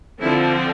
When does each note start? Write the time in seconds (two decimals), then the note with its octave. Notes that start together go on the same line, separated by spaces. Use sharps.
0.22 D3 F3 C4 E4